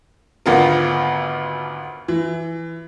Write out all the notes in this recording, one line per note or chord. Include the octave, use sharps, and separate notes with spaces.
G#1 D2 B3 F4 A#4
E3